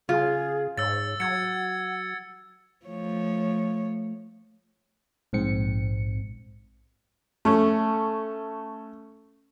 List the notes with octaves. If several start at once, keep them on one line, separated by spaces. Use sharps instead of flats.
C#3 F4 G#4
G#2 C#5 E6 A6
F#3 F#5 G#6 C#7
F3 A3 C#5
A#1 G#2 C4 C#7
A3 C#4